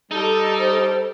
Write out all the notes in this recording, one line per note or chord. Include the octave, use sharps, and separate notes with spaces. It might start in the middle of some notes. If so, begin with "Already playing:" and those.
G3 D#4 A4
C5